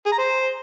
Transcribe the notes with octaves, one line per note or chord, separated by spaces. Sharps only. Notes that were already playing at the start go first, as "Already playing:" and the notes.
G#4
A#5
C5